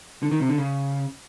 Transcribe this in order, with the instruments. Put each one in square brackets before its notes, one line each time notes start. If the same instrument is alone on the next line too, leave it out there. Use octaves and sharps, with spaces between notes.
[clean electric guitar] D3
D#3
C3
D3
C#3